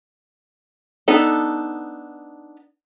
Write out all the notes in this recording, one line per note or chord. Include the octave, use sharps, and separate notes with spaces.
B3 D4 D#4 A4